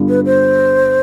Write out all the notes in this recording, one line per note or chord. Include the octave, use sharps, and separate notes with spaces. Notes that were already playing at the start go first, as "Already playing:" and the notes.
Already playing: G2 D3 G3 B3 F4
B4
C5